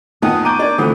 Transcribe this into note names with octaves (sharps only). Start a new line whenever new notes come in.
E2 A#2 D#3 B3 D#4 G5 D#6
A#5 C#6 D6 G6 D#7
D4 A#4 D5 D#5
D2 D3 E3 C4 F4 A4